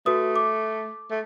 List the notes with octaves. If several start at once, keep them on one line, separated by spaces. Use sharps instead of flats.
A3 F#4 B4 D#6
D6
A3